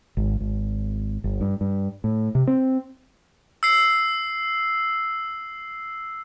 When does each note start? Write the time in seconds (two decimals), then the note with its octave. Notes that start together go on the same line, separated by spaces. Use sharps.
0.17 G#1
0.40 G#1
1.24 G1
1.41 G2
1.61 G2
2.04 A2
2.35 C3
2.47 C4
3.63 E6 C7